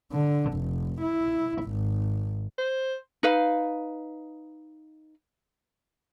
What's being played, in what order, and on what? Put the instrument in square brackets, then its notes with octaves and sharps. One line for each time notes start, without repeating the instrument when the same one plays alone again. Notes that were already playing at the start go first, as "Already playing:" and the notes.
[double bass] D3
F1
E4
G#1
[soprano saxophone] C5
[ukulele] D#4 B4 F5